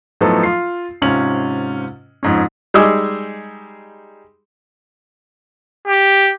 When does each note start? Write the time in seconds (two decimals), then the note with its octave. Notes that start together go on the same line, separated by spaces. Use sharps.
0.21 A2 F3 F#3 B3 D#4 A4
0.43 F4 C7
1.02 G#2 C3 C#4 F4 F#7
2.23 F2 G#2 C#4
2.74 G3 G#3 D#4 G#4 D6 E6
5.88 G4